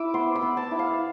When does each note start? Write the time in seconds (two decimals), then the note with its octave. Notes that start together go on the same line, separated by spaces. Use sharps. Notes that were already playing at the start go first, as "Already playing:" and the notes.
Already playing: E4 D6 E6
0.14 B3 C6
0.35 B5
0.42 B3
0.57 A5
0.71 E4
0.79 F5